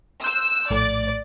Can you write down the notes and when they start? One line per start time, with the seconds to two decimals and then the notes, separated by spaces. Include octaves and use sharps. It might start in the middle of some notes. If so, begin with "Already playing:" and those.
0.24 C6 E6 F#6 G6
0.70 A#1 A2 A3 D5